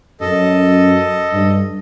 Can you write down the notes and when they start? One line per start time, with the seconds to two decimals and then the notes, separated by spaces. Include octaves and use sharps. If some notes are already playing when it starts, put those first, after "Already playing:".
0.21 F#2 A4 D#5
1.33 G2